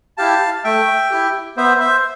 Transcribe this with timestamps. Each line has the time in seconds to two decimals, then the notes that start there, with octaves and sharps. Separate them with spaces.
0.17 E4 G4 F5 A5
0.64 A3 E5 G5
1.11 E4 G4
1.57 B3 C5 E5
1.80 C5 E5